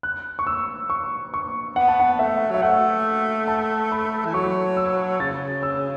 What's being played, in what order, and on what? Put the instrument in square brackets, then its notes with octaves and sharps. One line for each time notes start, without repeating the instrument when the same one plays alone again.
[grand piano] F#6
C#6
E6
C#6
C#6
[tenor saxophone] B3 [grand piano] F#5
[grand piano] A5
F#5
[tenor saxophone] A3 [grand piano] E5
[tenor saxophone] F#3 [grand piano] E5
[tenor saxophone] A3 [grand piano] F#5
[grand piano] A5
B5
[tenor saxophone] E3
[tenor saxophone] F#3 [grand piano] C#6
[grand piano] E6
[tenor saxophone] C#3 [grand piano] A6
[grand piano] E6